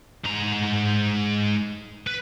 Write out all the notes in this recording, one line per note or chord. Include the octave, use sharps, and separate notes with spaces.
G#2 A#5
B4